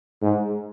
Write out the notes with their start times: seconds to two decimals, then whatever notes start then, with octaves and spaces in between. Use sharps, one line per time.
0.22 G#2